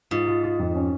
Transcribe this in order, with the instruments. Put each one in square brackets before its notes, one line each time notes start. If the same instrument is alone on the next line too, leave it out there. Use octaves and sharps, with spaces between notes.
[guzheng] G#2 [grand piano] F4
[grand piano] F4
F4
F2
C#4